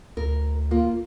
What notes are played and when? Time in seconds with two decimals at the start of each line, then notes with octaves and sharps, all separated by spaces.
0.17 D2 A#4
0.71 A#3 F4